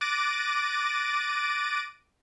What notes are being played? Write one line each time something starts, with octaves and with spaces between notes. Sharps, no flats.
D6 F#6 A6 A#6 D7 D#7